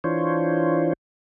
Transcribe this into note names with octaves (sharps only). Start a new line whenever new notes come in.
E3 D4 F4 C5 C#5